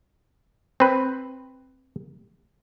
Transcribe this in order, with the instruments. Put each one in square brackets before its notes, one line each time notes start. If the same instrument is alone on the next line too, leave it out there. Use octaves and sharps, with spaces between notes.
[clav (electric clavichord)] C4 B4